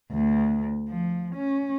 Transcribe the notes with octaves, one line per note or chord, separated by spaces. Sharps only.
D2
F3
C#4